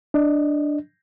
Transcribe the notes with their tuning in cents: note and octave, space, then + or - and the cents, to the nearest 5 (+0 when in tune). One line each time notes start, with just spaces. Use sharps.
D4 +0 D#5 +0